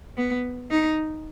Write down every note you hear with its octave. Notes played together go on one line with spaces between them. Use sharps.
B3
D#4